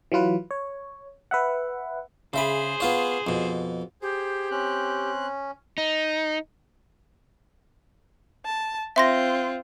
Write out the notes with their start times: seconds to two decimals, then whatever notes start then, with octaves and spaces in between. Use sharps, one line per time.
0.12 E3 F#3 F4 B4
0.51 C#5
1.31 B4 E5 F#5
2.34 C#3 G#4 C5 E5 B5
2.80 B3 F4 C#5
3.27 F2 B2
4.02 G4 G#4 C5
4.51 C4 C#4 F#6
5.78 D#4
8.45 A5
8.96 C4 F4 E5 C6 A#6